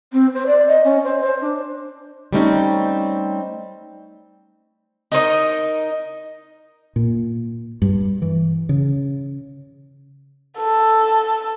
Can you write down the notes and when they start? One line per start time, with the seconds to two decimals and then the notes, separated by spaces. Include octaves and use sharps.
0.12 C4
0.34 C5
0.47 D5
0.68 D#5
0.84 C#4
1.04 C5
1.21 C5
1.41 D4
2.33 G3 A3 C4 C#4 D#4
5.12 D#4 A#4 C5 D#5
6.96 A#2
7.82 G2
8.22 E3
8.69 C#3
10.58 A4